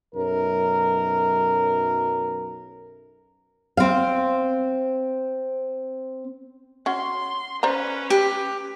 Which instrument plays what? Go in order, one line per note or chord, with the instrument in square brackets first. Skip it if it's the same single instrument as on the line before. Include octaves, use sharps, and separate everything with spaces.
[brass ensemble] B1 F#2 A#4
[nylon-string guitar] C4 F5
[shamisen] C#4 F#4 [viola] C6
[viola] C#4 B4 [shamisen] C5 D5 A#5
[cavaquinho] G4